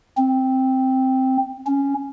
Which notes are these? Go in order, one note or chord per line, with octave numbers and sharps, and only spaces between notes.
C4
C#4